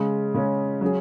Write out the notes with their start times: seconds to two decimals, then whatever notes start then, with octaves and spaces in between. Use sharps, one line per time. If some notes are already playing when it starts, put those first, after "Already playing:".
Already playing: C#3 G#3 C#4
0.34 C#3 G#3 C#4
0.81 F#3 C#4 G#4